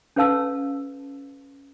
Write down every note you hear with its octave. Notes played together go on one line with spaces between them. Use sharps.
C#4 A4 B4 F5 A5 E6